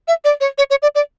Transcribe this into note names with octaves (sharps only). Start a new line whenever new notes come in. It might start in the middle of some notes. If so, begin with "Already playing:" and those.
E5
D5
C#5
C#5
C#5
D5
D5